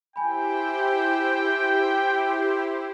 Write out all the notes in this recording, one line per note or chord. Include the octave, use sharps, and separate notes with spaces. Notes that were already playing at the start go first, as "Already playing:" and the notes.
E4 G4 C5 G5 G#5 B5